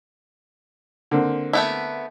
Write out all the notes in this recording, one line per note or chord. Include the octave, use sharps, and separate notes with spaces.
D3 A#3 C4
A3 B3 E4